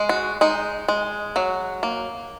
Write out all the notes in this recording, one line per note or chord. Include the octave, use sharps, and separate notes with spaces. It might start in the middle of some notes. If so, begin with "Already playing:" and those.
Already playing: G#3
F#4
G#3 D#4
G#3
F#3 F#4
A#3